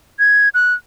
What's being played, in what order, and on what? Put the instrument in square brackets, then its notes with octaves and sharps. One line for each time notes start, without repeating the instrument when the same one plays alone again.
[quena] G#6
F#6